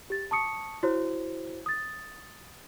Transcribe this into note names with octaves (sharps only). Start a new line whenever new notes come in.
G4 A6
A5 C#6 D#6 C#7
E4 F#4 C5 C#5
D#6 A6